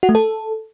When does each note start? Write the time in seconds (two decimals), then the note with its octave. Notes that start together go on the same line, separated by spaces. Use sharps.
0.03 F#4
0.09 A3
0.15 A4